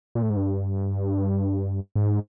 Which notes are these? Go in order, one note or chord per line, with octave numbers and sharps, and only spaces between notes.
A#2
A2
G#2
G2
G#2